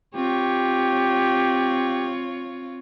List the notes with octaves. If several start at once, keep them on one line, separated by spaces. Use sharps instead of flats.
C4 F4 G4 C#5